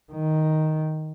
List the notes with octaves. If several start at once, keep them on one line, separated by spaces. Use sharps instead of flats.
D#3